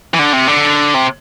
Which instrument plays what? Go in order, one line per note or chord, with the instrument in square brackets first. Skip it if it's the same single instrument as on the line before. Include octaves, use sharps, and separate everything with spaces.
[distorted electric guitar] E3
D3
C3
D3
C3